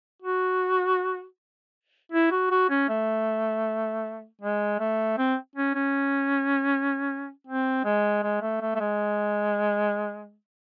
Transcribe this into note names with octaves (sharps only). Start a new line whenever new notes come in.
F#4
E4
F#4
F#4
C#4
A3
G#3
A3
C4
C#4
C#4
C4
G#3
G#3
A3
A3
A3
G#3